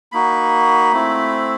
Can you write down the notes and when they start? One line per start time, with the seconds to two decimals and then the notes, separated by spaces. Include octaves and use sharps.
0.12 A#3 D#4 F#4 B5
0.92 A3 C4 E4